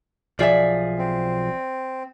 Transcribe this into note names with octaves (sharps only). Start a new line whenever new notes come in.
B1 F3 G#4 D5 E5
C4